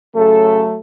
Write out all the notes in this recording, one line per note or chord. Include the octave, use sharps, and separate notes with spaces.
C#3 F#3 A3 A4